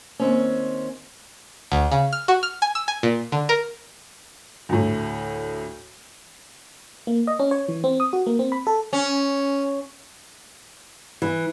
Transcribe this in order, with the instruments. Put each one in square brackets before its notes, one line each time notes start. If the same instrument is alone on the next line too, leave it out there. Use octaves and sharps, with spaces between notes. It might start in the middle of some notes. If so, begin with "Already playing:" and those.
[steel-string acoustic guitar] D#2 C4 C#4
[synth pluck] D2
C#3
F6
F#4
F6
G#5
E6
G#5
A#2
D3
A#4
[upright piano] D2 A2
[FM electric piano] A#3
D#5
C#4
C#5
E3
C4
D#6
F#4
A#3
C4
B5
A4
[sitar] C#4
[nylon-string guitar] E3